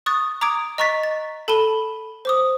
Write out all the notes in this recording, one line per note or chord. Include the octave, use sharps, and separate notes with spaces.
C#6 D#6 F#6 A6
A#5 D6 D#6 G#6 D7
D#5 A#5 C#6 F#6 A6 B6
A6
A4 A5 B5 D#7 G7
C5 D6 D#6